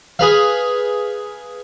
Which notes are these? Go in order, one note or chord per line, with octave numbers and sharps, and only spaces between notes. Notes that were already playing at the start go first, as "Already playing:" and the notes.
G#4 B4 F5